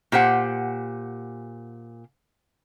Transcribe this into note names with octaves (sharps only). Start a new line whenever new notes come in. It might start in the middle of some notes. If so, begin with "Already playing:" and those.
A#2 G4 C5 F#5